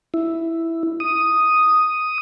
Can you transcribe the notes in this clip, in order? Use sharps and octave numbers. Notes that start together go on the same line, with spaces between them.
E4
D#6